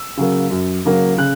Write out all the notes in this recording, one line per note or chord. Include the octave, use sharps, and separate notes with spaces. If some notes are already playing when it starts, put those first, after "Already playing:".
Already playing: E6
C#3 F#3 A#3
F#2
C#3 F#3 A#3
C#3 F#6